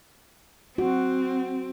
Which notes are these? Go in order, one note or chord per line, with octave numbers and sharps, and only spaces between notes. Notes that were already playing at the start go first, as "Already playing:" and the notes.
C4 F#4